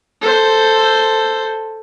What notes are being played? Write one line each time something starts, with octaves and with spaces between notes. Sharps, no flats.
A4 C5